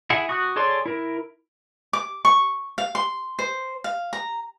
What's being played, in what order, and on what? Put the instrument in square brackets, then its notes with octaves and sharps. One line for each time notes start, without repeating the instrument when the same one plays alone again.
[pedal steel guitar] E4 G#4 F#5
F#4 D#6 F#6
G#4 A4 C#5 D5 C6
E4 A#4
[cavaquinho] D6
C#6
F5
C6
C5
F5
A#5